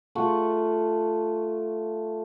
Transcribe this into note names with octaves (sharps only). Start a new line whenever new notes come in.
A3 F4 F#5 C#6